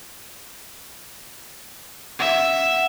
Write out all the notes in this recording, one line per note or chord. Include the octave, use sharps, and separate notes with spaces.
E5 F#5